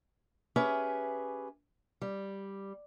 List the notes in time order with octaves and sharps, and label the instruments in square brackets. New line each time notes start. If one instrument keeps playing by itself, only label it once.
[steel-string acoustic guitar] C#4 G4 G#4 B4 E5
G3